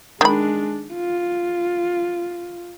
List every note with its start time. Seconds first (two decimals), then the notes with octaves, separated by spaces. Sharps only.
0.21 D#3 G#3 D4 B5
0.94 F4